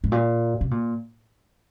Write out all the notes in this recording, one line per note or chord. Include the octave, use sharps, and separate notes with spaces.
G#2
A#2
C3
A#2